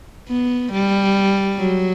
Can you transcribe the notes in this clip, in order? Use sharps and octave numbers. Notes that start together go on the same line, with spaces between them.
B3
G3
F#3